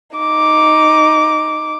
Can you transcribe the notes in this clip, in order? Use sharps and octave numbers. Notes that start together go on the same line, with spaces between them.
D#4 D6